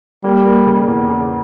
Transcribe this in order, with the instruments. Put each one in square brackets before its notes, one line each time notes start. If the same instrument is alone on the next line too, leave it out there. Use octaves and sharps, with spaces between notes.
[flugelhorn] G3 [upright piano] A#3
[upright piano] A#3
C#3
E2
C#3